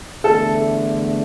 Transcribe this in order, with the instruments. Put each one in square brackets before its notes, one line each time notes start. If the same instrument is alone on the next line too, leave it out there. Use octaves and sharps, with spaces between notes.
[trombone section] E2 D3 A3 [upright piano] A4